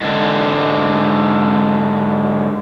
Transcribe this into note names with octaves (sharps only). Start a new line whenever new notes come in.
G#2 D3